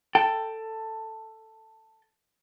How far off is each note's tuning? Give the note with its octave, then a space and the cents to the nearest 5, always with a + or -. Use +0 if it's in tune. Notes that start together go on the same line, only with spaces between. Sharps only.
A4 +10 G5 +0